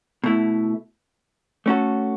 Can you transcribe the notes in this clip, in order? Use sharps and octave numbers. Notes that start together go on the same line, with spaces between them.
B2 A3 E4
A3 C#4 F#4 A4